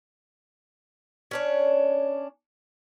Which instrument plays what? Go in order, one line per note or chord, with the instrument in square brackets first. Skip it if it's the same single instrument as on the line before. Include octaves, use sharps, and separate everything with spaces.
[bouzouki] C#4 D4 C#5